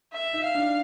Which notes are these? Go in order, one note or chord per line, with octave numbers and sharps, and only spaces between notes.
E5
D#4
F5
D4